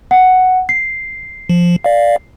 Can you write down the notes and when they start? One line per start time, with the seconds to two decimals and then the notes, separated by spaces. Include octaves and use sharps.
0.11 F#5
0.69 C7
1.49 F3
1.84 D5 F5